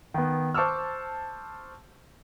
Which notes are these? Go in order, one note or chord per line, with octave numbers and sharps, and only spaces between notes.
D#3 B3
C5 A5 C#6 D6 E6 F6